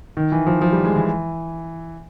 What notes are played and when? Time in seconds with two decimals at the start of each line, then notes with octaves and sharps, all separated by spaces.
0.17 D#3
0.32 E3
0.47 F3
0.62 F3
0.73 G3
0.85 G#3
0.96 E3